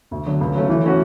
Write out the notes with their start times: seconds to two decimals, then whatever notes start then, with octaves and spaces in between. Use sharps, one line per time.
0.11 D2
0.26 D3 F#3
0.41 C#2
0.55 C#3 F#3 A3 C#4
0.69 E3
0.84 A3 C#4 F#4